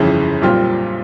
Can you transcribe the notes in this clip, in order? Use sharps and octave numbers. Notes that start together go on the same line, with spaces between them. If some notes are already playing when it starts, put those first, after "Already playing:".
Already playing: G1 F2 C#3 E3
B1 A#2 G3 C4 F4